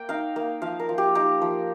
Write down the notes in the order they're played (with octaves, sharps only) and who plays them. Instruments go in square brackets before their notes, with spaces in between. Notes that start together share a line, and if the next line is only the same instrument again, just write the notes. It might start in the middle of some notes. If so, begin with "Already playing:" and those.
Already playing: [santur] A#3 G5
D#4 F5
A#3
F3 F5
A#4
F3
G4
D#4 G4
F3